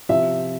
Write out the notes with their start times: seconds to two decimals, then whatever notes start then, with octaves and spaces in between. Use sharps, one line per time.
0.09 C3 F3 E5